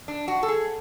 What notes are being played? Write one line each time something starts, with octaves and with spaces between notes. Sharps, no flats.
D4
F#4
A4
G#4